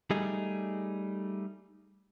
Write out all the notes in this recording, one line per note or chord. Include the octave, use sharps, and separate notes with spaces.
G3 A3 D#4 G#4